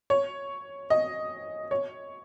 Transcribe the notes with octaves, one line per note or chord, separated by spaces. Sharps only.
C#5
D#5
C#5